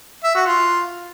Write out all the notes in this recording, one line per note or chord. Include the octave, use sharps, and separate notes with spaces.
E5
F#4
F4